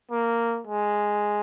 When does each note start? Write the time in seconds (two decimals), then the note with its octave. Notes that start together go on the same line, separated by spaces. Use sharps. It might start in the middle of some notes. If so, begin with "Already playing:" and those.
0.11 A#3
0.67 G#3